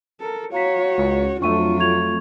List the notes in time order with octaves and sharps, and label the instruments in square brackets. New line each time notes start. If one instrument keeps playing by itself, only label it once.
[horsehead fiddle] A4 A#4
[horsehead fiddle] F#4 C#5 [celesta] F5 A#5 B6
[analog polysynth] C#2
[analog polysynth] F2 A3 [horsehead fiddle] F#3 F4 [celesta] D4 C#6 D#7
[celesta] C#6 G#6 F7